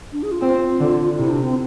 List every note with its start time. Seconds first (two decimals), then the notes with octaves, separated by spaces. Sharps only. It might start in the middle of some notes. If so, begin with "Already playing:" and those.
0.13 D4
0.23 G#4
0.32 F4
0.41 C4
0.80 D3
1.18 C3 E4
1.30 D4
1.42 C4